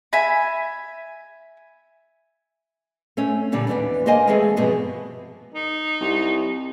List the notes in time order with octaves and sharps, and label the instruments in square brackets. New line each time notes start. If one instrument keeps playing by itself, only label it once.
[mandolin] E5 G#5 B5
[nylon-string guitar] A3 C4 C#4
A#2 D3 G3 D4
D#2 E3 B3 D4 D5
A#3 A#4 C5 D#5 F5 G#5
E3 G#3 A3 C4 G#4 A4
G2 B2 F3 G#3 B3
[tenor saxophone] D#4
[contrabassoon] C2